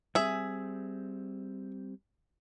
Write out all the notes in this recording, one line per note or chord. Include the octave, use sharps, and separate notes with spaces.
G3 C4 G#4 E5